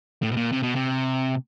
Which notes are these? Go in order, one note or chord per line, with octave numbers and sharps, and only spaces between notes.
A2
B2
A#2
C3
B2
C3